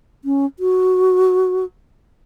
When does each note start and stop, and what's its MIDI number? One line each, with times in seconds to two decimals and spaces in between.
0.24 0.46 61
0.59 1.65 66